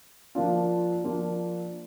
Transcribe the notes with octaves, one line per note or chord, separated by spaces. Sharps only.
F3 A#3 D4 F4
F3 A#3 D4 F4